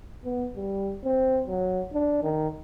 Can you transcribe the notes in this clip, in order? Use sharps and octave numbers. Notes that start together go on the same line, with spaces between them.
B3
G3
C4
F#3
D4
D#3